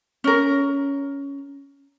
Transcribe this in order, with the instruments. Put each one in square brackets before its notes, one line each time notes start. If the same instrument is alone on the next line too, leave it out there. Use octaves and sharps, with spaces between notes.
[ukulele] C#4 A#4